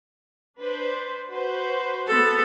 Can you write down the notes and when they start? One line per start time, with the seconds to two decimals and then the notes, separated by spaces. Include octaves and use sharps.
0.59 D4 B4 C5
1.28 F#4 B4 C5
2.07 B3 A4